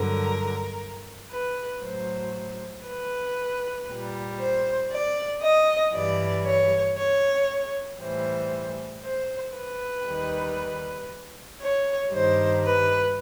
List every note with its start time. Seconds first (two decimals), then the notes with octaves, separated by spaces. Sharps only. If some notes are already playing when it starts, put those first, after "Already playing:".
Already playing: G2 D3 F#3 A#4
1.30 B4
1.81 A2 F#3 C5
2.85 B4
3.88 A#2 G3
4.39 C5
4.90 D5
5.42 D#5
5.93 G2 E3 G3 D5
6.45 C#5
6.97 C#5
7.99 A2 E3 G3 C5
9.03 C5
9.55 B4
10.05 D#2 D#3 G3
11.60 C#5
12.12 G2 D#3 G3 C5
12.63 B4